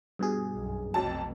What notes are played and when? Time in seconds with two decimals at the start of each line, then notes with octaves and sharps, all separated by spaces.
0.19 G2 B2 G#4
0.55 B1 F#2
0.94 F1 B1 F2 F#3 A5